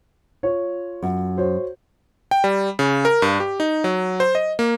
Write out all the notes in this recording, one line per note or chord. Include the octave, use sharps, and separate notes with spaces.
F4 C#5
F#2
F#4 C5 C#5
G5
G3
C#3
A#4
G2
G4
D#4
F#3
C5
D#5
A#3